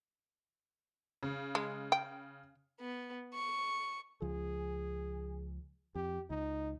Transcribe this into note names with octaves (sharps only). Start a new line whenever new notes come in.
C#3
G#3
G5
B3
C#6
C#2 F3 G#4
F2 G4
C#2 D#4